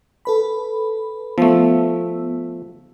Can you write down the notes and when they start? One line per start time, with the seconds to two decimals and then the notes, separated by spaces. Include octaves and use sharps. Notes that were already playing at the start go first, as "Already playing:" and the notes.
0.25 A4 B4 B5
1.38 F3 A3 B3 E6